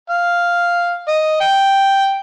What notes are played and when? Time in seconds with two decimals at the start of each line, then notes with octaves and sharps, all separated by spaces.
0.10 F5
1.08 D#5
1.41 G5